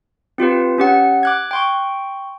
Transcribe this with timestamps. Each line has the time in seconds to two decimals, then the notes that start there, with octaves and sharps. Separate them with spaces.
0.38 C4 F4 G4 B4
0.78 C#4 G4 F#5
1.23 D6 F#6 G#6
1.51 G5 C6 C#6